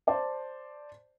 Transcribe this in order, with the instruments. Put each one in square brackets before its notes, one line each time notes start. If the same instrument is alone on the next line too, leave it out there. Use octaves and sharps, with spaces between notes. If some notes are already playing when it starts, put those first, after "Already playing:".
[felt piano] C5 D5 A5